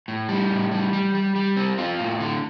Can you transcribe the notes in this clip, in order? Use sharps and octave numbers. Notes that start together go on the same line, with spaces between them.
A2
G3
A2
G3
G3
G3
G3
C4
F4
A2
D3